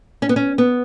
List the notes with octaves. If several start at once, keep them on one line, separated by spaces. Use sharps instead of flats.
C#4
B3
C#4
B3